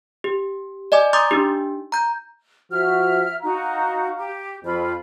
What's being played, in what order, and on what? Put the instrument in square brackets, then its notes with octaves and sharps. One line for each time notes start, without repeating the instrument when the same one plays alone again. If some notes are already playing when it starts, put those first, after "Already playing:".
[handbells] G4
D5 D#5 G#5 D6
A#5 C6 D6 D#6 G6 A6
D4 D#4 G4
A#5 G6
[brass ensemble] F3 F#4 [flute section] E5 F6
[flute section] D#4 F#4 [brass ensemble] F5 A#5
[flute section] G4
[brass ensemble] F2 [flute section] F4 B5